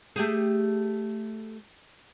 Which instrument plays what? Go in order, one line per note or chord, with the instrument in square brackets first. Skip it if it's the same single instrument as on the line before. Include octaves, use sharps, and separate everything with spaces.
[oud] A3 G4 G#4